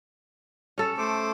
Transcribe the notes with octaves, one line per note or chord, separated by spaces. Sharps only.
C#4 A4
A3 C5 D6